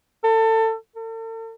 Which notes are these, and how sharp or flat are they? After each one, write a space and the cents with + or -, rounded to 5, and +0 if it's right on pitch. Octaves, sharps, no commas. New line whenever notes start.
A4 +25
A4 +45